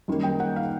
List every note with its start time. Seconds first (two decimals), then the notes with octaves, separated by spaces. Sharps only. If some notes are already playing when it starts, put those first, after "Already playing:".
0.08 F#2 D#3 G3 A#3
0.23 G5
0.40 F#5
0.56 F5